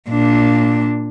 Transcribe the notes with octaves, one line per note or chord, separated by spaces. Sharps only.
A#2 D4